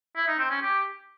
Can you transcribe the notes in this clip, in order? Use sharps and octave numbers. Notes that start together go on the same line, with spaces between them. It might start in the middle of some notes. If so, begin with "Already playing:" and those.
E4
D#4
C4
C#4
G4